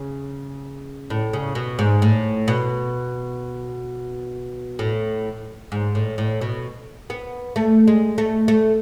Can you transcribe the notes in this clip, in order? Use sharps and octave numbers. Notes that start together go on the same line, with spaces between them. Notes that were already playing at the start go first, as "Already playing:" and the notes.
Already playing: C#3
A2
C#3
B2
G#2
A2
B2
A2
G#2
A2
A2
B2
B3
A3
G#3
A3
A3